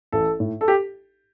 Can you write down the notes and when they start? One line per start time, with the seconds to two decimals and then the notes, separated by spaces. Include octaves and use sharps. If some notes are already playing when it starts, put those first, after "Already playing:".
0.12 A1 A4
0.40 A2
0.61 A4
0.68 G4